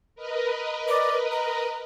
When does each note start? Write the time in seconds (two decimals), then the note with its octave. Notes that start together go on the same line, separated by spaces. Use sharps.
0.15 A#4 B4 D#5
0.88 D5
1.32 A#5